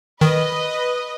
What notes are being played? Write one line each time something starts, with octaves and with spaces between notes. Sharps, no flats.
D#3 B4 D#5